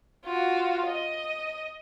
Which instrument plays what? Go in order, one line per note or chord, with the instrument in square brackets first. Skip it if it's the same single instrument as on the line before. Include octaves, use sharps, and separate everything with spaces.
[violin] F4 F#4
D#5